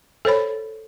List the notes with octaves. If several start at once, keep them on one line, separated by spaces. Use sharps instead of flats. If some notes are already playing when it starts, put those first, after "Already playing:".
A4 C5 C#5 B5